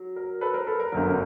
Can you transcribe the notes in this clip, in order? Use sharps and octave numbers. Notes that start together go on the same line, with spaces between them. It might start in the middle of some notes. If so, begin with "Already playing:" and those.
Already playing: F#3
A#4
A4 B4
A#4 C5
A4 B4
A#4
G1 F#2 D3 A#4
A#4